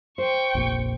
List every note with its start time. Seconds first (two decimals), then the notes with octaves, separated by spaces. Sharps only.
0.18 C5 G5 C#6
0.55 F1 A#1